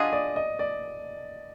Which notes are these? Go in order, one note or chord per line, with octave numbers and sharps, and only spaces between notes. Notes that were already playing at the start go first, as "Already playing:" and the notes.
Already playing: F#3 D4 F4 G#4 D#5
D5
D#5
D5